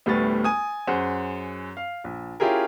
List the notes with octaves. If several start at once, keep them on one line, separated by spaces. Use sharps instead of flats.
D2 A2 G3 A3 B3 A6
G#5 D#6
F#2 G#4 C5 F#5
F5
A#1
C#4 E4 F4 G4 G#4 A#4